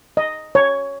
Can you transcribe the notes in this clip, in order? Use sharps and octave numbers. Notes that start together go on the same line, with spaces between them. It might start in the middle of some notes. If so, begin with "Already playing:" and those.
D#5
C#5